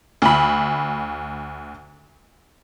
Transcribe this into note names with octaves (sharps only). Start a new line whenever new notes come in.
D2 B5